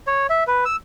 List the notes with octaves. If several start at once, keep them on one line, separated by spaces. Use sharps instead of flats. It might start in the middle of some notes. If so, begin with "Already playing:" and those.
C#5
E5
B4
E6